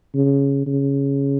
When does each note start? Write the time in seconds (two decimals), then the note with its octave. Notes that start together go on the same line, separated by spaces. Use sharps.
0.15 C#3
0.66 C#3